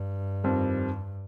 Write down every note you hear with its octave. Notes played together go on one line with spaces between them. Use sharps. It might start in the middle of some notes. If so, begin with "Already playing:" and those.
Already playing: G2
F2 D#3 G3 C4